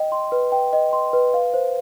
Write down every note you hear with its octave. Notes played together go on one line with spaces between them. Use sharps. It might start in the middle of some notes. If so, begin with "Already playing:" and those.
Already playing: D#5 G5
C6
B4
G5
D#5
C6
B4
F5
C5